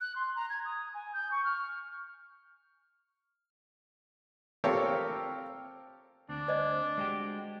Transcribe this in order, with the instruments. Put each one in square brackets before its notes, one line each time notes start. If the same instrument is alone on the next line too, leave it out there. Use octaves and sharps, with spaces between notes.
[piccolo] F#6
C6
A#5
G#6
D#6
G#5
G6
C#6
F6
[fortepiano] C4 F4 G4 A4 A#4 C#5
[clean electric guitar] D2 C4 [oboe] D4
[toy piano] C5 D5 D#5
[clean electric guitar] G#3 F#4 G4